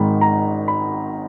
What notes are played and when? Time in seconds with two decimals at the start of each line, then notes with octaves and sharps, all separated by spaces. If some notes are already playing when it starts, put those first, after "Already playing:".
Already playing: G#1 G#2 D#3 B5
0.21 A#5
0.68 B5